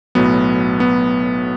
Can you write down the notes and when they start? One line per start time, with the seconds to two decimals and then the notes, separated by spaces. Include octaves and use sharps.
0.15 B1 A2 F#3 B3
0.80 B3